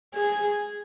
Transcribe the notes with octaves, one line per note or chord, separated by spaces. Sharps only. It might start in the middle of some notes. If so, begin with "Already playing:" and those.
G#4